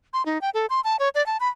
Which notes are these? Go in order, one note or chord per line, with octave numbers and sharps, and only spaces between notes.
C6
D#4
G5
A4
C6
A5
C#5
D5
A5
B5